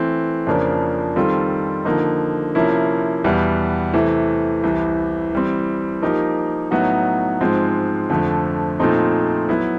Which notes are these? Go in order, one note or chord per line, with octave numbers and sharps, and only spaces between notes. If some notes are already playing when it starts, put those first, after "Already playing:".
Already playing: E3 A3 C4
F2 C#3 F3 A#3 D4
D#3 G3 C4 F4 A4
D3 F3 A#3 D#4
C3 F3 A#3 C#4 E4
E2 B2 G3 B3
C3 E3 A3
C2 C3 E3
E3 G3 C4
F3 A#3 D#4 G4 A#4
A2 F#3 B3 D#4 F#4
G#2 F3 G#3 C4
F2 D3 F3 A3
A#2 F3 A3 C4 D#4
F#3 B3 E4